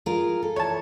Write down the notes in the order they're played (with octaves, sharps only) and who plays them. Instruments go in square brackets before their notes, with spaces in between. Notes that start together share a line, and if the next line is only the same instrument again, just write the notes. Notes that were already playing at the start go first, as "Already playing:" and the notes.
[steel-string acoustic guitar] F4 G#4 A#4
A4
[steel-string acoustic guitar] E3 [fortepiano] C#5 A5